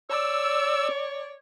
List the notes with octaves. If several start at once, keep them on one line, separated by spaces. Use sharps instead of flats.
C#5 D5 E6